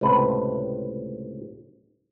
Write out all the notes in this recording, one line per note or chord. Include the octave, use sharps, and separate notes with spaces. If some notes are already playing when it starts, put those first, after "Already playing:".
C#2 A2 C3 B4